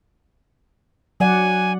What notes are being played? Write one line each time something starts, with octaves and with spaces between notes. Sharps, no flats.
F#3 D5 F#5 G#5